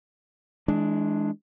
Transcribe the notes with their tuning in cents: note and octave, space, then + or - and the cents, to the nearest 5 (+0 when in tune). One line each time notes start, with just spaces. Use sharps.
E3 -30 G#3 +10 D4 +0